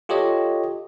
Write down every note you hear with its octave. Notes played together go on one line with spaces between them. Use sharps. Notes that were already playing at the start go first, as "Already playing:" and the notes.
F4 G4 A4 C#5 D#5